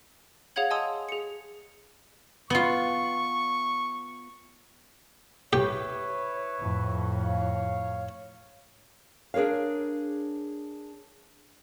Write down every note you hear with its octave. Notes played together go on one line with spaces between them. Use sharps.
G#4 C#5 F5 F#5 G#6 F#7
D#5 G#5 A5 C6 D#6 E6
G#4 C#7
B3 F4 C#6
E4 G4 B4 C#5
F2 A2
C#5 F5
D4 G#4 A#4 C#5 F5